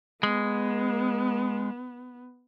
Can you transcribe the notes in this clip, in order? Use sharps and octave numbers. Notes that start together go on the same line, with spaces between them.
G#3 B3